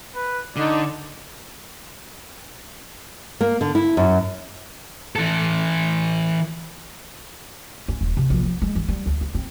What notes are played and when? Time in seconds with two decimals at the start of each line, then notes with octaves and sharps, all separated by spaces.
0.15 B4
0.56 D3 D#4 D5
3.41 A#3
3.61 D3
3.75 E4
3.97 F#2
5.16 E3 A4
7.88 C#4
8.01 D#1
8.17 C3
8.30 A#1
8.43 F3
8.62 G#3
8.76 E3
8.88 G3
9.06 D2
9.21 A#3
9.35 C4